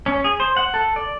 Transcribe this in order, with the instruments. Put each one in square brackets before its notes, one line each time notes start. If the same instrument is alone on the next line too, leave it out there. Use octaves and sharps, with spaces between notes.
[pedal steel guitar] C#4
G#4
C5
F#5
A4
D5